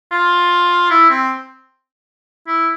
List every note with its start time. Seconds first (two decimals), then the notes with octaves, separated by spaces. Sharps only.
0.12 F4
0.90 E4
1.10 C4
2.47 E4